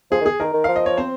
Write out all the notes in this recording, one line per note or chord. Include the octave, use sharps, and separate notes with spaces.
F3 G#4
D#3
G#4
D#3 A#4
D#3
F3 F5
D#5
C#5
C4 C5